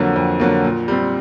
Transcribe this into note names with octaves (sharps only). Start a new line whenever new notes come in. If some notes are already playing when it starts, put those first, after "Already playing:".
Already playing: F2 D3 F#3 A#3
F2
D3 F#3 A#3
A#2
G3 C4